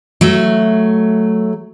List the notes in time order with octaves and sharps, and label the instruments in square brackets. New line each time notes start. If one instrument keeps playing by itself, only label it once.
[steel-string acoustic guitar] F#3 A3